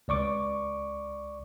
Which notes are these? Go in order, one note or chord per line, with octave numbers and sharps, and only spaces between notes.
C#2 D5 C#6 D6